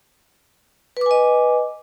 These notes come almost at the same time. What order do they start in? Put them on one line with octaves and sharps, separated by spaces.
B4 D6 G#5 D#5